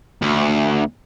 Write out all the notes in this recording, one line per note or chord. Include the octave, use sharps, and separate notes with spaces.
D2